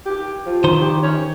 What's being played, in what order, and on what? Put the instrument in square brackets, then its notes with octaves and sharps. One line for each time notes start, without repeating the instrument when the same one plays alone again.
[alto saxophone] G4
F3
[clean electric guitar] D#3 C5
[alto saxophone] G4
C#5